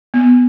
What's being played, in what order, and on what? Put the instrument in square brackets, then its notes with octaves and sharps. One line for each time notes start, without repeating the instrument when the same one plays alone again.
[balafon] B3